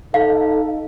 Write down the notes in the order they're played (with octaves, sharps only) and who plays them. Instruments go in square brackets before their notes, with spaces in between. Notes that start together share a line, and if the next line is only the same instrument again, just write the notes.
[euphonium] D#4 [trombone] A4 [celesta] F5